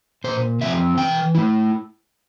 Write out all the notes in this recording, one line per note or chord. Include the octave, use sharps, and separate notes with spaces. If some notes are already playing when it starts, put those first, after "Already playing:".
A#2 C5
F3 C4 F4 E5
E3 G5
A3 E4